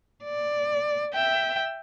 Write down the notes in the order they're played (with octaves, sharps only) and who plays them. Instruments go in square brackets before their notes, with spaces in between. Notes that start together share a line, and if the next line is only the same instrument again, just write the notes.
[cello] D5
[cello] E5 [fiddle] G5